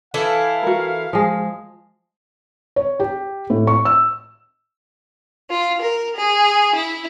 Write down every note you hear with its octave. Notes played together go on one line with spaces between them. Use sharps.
E3 E4 A4 F5
F#4 A#4
F3 G#3
C#5
G4
A2
C#6
E6
F4
A#4
G#4
E4